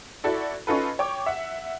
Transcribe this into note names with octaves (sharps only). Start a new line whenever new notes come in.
E4 F#4 A4 D5
C#4 D#4 F4 A4 B4
C#5 G5 D6
E5 F#5